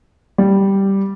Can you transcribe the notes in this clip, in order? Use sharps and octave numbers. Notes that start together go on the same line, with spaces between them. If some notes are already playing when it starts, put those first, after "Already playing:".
G3